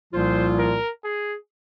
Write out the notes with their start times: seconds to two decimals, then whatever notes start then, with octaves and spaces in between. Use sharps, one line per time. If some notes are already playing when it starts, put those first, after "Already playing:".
0.14 C2 A#2 F3 A#3 F4 C5
0.58 A#4
1.04 G#4